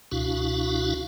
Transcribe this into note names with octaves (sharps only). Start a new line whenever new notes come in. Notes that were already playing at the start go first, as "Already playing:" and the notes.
C#2 B2 D4 E4 F#4 F5